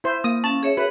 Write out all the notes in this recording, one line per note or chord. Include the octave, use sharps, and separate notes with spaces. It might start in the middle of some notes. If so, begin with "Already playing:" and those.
E4 C5
A#3 F5 D#6
C#4 A5
G#4 C#5 E5
F#4 A#4 B4